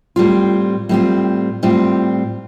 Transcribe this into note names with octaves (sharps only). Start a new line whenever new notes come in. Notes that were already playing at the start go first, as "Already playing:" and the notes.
A2 G3 C4 F4
A2 G3 C4 F4
A2 G3 C4 F4